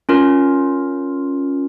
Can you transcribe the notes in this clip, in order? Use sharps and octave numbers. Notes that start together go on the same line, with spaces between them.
C#4 F4 A#4